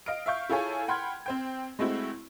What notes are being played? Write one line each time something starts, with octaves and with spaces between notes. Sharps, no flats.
D#5 F5 F6 D7
E5 F5 C#6 G6
E4 F4 G#4 A4 C#5 G#5
F#5 G5 B5 C6 F6 G#6
C4 C5 G5
G#3 A3 C4 E4 F#4